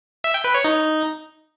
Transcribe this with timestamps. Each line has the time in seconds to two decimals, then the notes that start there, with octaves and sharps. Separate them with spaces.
0.24 E5
0.34 G5
0.44 B4
0.54 C#5
0.65 D#4